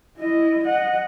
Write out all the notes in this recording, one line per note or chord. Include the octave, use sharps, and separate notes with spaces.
E4 D#5
D#5 F#5